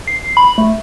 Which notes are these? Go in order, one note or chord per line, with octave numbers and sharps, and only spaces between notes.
C7
B5
A3